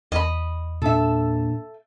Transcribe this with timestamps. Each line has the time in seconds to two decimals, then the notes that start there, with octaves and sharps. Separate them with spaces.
0.12 E2 D#5 B5
0.82 A#2 D4 A4 E5